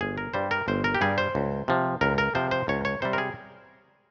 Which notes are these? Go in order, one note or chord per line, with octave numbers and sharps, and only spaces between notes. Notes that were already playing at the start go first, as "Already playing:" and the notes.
G1 G#4
A#4
G2 G3 C5
A#4
G1 C5
A#4
G4
G2 G3 G#4
C5
C#2
C3 F3
C#2 A#4
A#4
C3 F3 C5
C5
C#2 C#5
C#5
C3 G3 C5
A#4
G#4